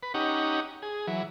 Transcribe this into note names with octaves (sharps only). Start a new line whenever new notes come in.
B4
C#4 D#4 G4 F#5
G#4
E3 F#3